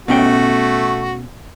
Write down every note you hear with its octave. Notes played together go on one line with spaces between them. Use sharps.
B2 A3 C#4 F#4 G5